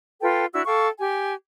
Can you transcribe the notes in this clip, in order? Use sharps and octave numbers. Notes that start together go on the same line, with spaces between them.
F4 A4 B4 G5
D4 E4 F#4 E6
A4 F5 G5 C#6
G4 G#5